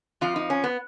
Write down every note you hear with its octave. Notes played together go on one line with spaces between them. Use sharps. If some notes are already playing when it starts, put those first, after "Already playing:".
F2 F3 F4
D#4
C#4
B3